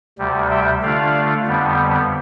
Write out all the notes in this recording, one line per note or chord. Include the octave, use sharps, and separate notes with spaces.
D2 C3 G3
E5 G5
D3 A3 D4 F4 D5 F5
F2 D3 G3 B3